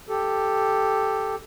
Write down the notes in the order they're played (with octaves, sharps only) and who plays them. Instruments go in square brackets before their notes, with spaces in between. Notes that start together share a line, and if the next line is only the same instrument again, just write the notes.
[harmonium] G4 A4